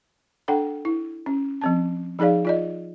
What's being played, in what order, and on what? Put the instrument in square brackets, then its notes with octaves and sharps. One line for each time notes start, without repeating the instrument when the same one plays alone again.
[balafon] D4 A4 F#5 G5
E4
C#4
F3 C4 A5
F3 D#4 G#4 D5 F5
F4 D5 D#5